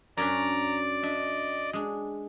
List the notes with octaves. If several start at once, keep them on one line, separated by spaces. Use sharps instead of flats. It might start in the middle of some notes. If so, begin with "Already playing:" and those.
F#2 C#4 D4 D5 A#5
D4 D#5 E5
G#3 D4